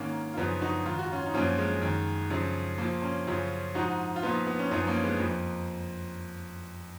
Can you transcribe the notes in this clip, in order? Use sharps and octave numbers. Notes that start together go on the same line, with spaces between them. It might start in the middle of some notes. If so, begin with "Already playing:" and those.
Already playing: G#2 D#3 A#3 C#4
F4
F#2 C#3 F3 B3 D#4
D#4 F#4
G#2 D#3 F4
F#4
C#4 F4
D#4
F#2 F3 A#3 C#4
G#3
F#2 D#3
F#2 C#3 F3
A#2 F3 A#3
A#3 C#4
F#2 C#3 F3 C#4 F4
G#2 F3 D#4 F#4
F4
A#2 F3 B3 D#4
B3
C#4
F#2 F3 B3 D#4
A#3 C#4
G#3 B3
F2 F3 A#3